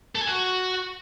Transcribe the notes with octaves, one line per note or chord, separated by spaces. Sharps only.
A4
G#5
F#4